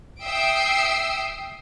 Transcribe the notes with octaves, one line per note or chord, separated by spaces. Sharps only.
E5 G5 D#6 E6 C7 D7